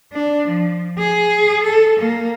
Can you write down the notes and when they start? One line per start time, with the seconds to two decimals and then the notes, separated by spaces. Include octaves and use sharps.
0.12 D4
0.47 F3
0.99 G#4
1.63 A4
1.99 A#3